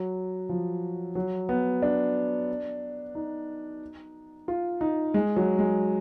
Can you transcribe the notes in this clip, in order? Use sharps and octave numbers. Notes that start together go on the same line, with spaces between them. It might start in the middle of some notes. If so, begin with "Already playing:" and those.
Already playing: F#3
F3
F#3
B3
D4
D#4
F4
D#4
G#3
F#3
G#3